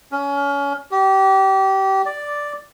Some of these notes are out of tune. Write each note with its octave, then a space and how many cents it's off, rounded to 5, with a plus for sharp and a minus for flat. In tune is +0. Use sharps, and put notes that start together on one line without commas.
C#4 +25
G4 -25
D5 +0